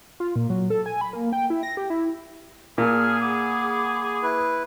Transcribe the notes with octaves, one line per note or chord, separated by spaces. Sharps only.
F4
A#2
F#3
A4
G#5
B5
A#3
G5
E4
A#6
G4
E4
A#2 G#4 G#5 A5 F6
F#5 B5 D6
E4 B4